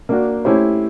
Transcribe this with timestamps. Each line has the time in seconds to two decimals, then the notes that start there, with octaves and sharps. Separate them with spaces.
0.09 A#3 D4 F#4
0.45 A3 C#4 E4 G4 C5